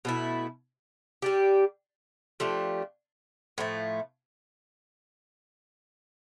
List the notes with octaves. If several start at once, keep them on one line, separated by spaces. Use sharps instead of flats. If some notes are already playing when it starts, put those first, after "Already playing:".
B2 A3 E4
G3 D4 G4
F3 A3 D4 G4
A2 F3 A3